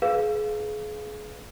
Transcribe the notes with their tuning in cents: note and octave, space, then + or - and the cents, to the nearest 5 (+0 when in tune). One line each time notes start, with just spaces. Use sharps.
G#4 +30 B4 +0 F5 +0